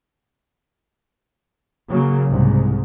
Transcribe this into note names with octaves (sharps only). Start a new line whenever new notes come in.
C#3 F#3 A#3
C2 G#2